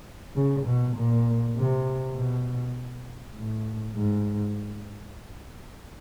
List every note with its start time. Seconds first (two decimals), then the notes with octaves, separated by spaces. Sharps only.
0.36 C#3
0.66 B2
0.96 A#2
1.56 C3
2.16 B2
3.35 A2
3.95 G#2